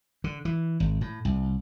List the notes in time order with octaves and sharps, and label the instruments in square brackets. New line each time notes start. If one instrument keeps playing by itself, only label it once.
[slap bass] D3
E3
G#1
A2
C2